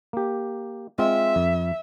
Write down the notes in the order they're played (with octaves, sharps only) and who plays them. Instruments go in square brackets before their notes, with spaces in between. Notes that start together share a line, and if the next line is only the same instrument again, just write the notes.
[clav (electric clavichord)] A#3 G4
[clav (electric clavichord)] G#3 C4 F4 [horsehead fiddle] E5
[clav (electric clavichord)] F2